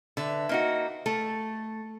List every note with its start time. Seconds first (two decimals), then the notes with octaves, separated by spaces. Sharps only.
0.17 D3 B4 E5
0.49 A#3 D#4 F#4
1.06 A3 A4